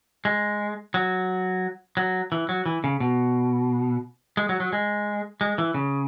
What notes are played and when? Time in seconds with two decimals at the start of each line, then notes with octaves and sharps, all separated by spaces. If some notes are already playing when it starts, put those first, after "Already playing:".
0.25 G#3
0.94 F#3
1.97 F#3
2.32 E3
2.49 F#3
2.66 E3
2.84 C#3
3.00 B2
4.37 G#3
4.49 F#3
4.60 F#3
4.73 G#3
5.41 G#3
5.58 E3
5.74 C#3